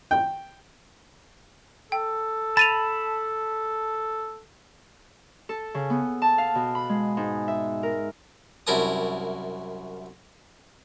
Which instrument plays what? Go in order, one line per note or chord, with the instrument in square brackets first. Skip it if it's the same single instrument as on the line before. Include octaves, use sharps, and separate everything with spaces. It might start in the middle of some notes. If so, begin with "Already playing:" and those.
[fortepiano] G5
[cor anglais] A4 [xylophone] G5
[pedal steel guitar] A5 B5 [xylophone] A6 D#7 F7
[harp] A4
C#3
B3
A5
F5
B2
B5
G#3
G#2
E5
A#4
[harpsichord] C2 F#2 E4 A#4 A5 D#6